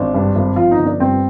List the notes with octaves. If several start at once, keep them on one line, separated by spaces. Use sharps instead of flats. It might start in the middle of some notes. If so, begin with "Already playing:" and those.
Already playing: G#1 D4
G2
G#1
F3 F4
D#4
G1
D4
G2 C4